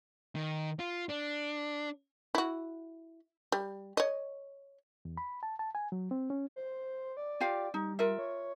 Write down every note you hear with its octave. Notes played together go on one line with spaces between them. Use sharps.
D#3
F4
D4
E4 F#4
G3
C#5 D#5
E2
B5
A5
A5
G#5
F#3
C4
C#4
C5
D5
F4 G4 F5
G3 D#4
F4 A#4 E5
C#5